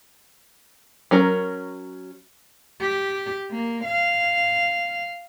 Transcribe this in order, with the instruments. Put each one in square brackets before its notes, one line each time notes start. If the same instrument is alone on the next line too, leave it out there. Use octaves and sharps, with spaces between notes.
[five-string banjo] F#3 C#4 A#4
[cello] G4
A#3
F5